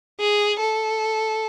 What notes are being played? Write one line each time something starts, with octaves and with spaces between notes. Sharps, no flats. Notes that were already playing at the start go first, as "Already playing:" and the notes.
G#4
A4